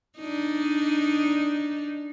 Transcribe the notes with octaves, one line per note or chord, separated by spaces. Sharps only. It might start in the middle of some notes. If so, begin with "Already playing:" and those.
D4 D#4